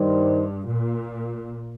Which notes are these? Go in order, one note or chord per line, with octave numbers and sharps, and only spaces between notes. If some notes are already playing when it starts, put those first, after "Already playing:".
Already playing: G2 D#3 G3 D#4 C5
A#2